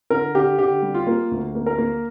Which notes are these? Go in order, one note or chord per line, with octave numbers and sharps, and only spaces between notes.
D3 A#4
D3 G4
D3 G4
G3
F4
A#3
D2
A#3
A#4
A#3